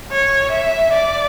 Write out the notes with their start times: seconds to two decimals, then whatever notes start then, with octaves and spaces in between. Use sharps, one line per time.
0.11 C#5
0.52 E5
0.93 D5